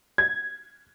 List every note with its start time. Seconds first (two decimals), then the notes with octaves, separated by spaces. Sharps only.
0.18 G#6